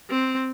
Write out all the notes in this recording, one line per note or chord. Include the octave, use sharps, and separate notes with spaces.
C4